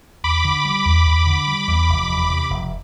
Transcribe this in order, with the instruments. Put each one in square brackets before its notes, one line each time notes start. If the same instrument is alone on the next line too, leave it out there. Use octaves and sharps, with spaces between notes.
[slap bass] E2 [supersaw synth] B5 D6
[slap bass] D3
G3
E2
E2
D3
G3
E2
F1
E2
C3
F1